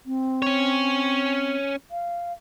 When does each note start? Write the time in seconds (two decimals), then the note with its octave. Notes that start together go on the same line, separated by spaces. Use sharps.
0.06 C4
0.42 C#4 C#5
1.91 F5